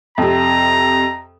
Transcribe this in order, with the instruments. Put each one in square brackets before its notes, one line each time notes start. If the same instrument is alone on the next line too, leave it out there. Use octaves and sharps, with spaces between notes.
[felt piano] F2 C3 [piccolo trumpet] A#5